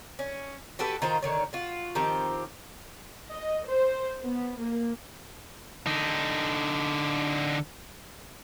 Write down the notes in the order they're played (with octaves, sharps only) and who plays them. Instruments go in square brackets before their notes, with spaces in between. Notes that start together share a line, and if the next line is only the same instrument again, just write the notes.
[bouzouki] C#4
F#4 G4 A4 B4
D#3 F4 C5 A#5
D3 D#3 C#5
F4 F#4
D#3 F3 C4 G4
[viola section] D#5
C5
B3
A#3
[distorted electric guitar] D3 D#4